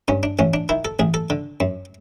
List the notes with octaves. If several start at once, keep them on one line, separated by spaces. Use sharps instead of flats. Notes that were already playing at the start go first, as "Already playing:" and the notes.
G2 C#4
D4
A1 C#4
D4
D#3 E4
A4
A1 G#4
A4
D3
F#2